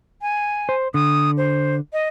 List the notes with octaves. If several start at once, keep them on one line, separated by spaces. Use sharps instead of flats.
G#5
C5
D3 D#6
C5
D#5